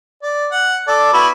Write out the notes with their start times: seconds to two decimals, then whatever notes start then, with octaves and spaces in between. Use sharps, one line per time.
0.23 D5
0.52 F#5
0.88 A4 D5
1.13 B3 E4 F#4